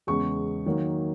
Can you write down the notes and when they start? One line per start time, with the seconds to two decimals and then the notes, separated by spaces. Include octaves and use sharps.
0.07 E2 C#3 G#3 C#6
0.66 D#3 F#3 A#3